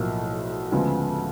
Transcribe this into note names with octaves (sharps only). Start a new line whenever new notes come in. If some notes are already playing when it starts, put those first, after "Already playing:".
Already playing: B1 A2 F3 A#3
D2 C#3 F3 G#3 B3